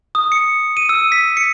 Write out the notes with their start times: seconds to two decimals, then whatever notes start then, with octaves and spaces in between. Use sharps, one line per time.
0.15 D#6
0.32 C#7
0.77 D#7
0.89 E6
1.12 B6
1.37 C#7